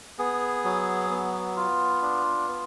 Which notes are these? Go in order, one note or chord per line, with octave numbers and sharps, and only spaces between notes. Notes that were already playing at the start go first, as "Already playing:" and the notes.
B3 G#4
F#3
B3
F4
D4
B3